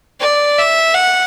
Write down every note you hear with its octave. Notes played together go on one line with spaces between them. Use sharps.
D5
E5
F#5